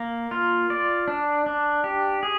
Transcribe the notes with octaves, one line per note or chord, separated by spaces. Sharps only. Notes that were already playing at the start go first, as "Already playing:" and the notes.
Already playing: A#3
F4
D5
D4
D4
G4
G#4